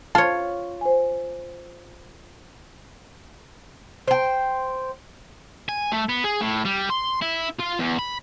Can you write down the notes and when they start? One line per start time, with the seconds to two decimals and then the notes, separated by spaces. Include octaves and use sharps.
0.15 F4 C#5 A5
0.81 C5 G#5
4.08 C5 G5
5.69 G#5
5.92 A3
6.09 B3
6.24 G#4
6.41 A2
6.65 G3
6.90 C6
7.22 E4
7.60 F4
7.80 E2
7.99 B5